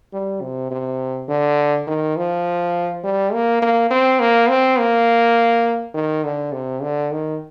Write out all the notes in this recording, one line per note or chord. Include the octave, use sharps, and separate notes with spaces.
G3
C3
C3
D3
D#3
F3
G3
A#3
A#3
C4
A#3
C4
A#3
D#3
D3
C3
D3
D#3